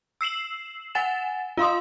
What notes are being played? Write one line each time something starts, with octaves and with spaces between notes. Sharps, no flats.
E6 C7 E7 F#7
F#5 G#5 A6 E7
F4 F5 C6 D#6